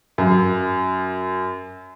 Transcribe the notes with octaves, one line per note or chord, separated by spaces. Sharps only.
F#2